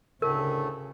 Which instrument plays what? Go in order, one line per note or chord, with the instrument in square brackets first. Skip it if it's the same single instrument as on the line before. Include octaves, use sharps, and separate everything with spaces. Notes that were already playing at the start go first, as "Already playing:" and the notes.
[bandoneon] D2 A2 A3 [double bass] C#3 [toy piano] A#4